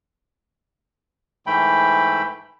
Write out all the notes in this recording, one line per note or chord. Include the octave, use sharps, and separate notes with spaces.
G#2 E3 A3 G5 B5